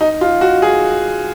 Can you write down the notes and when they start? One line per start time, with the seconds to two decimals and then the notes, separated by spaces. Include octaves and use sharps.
0.01 D#4
0.21 F4
0.41 F#4
0.62 G#4